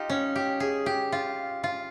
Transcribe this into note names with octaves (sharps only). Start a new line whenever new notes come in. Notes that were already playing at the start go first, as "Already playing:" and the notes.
Already playing: D#4 F4 G4
C#4
G4
G#4
G4
F4
F4